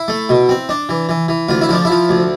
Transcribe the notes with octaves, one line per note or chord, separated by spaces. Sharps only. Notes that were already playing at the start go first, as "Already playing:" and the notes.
Already playing: E4
A3
B2
C4
D4
E3
E3
E3
D2 F4
E4
F3 D4
F3 E4
D2